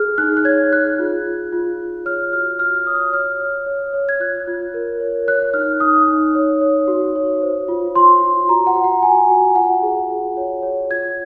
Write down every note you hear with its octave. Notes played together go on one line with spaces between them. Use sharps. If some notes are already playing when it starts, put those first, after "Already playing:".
Already playing: G#4 F6
D#4 F#6
F#6
C#5 G#6
G#4 F#6
F4
F4
F4
F4
C#5 F6
F#4 F6
F#4 F6
C#5 D#6
C#5 F6
C#5
C#5
C#5
G#6
F4 F#6
F4
A#4
C#5
C#5 F#6
D#4 F6
D#4 D#6
D#4
C#5
C#5
F#4
C#5
C5
F4
F4 C6
F4
F#4 A#5
F#5
F#4
F#5
F#4 G#5
F#4
F4 F#5
G#4
F4
C#5
C#5
F4 G#6